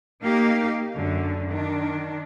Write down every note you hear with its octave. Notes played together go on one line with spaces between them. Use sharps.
A#3 D#4 G4 F5
F#2 D3
D#3 D4